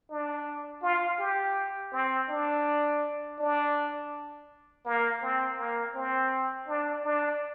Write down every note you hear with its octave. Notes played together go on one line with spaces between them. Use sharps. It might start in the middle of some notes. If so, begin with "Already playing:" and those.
D4
F4
G4
C4
D4
D4
A#3
C4
A#3
C4
D4
D4